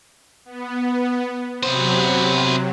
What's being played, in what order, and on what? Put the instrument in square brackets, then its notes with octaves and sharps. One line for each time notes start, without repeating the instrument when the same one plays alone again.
[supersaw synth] B3
[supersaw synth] C3 F#3 [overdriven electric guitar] B3 C5